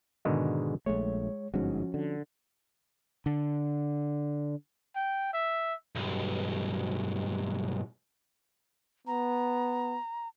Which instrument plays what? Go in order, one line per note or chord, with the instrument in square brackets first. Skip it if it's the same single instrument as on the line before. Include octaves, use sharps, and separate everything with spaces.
[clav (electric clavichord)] G#2 B2 D3 D#3 G#3
[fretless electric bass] A#1 A3 [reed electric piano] G#3 C#5
[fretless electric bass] G1 G#2 [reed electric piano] F3 C#4 F#4
[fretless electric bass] D3
[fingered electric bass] D3
[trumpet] G5
E5
[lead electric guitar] B1 G2
[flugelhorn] B3 [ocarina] A#5